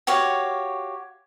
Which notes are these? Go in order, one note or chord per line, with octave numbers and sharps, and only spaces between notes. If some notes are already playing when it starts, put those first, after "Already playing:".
F#4 G4 C#5 F5